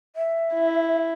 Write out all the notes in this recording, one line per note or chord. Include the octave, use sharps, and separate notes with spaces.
E5
E4